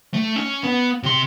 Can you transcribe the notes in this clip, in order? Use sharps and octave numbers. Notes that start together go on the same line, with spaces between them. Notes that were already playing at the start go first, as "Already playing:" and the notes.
A3
C#4
B3
C3 C6